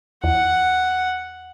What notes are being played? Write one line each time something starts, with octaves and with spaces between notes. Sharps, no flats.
E2 F#5